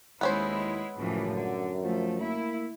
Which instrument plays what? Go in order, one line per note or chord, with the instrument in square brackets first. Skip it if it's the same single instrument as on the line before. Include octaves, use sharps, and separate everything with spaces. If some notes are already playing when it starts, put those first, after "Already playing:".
[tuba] D#2 [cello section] G#3 E4 [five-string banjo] B3 C#4 C5
[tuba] C#2 [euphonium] F#2 [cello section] A2 E3 F3
[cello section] D3
[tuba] F3 [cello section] A3
[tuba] A#3 [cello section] E4